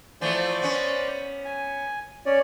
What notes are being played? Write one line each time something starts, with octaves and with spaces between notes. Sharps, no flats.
E3 F3 A3 C5 D5
B3 C#4
G#5
C#4 C#5 D5